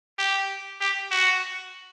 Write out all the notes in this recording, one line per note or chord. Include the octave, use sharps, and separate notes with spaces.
G4
G4
F#4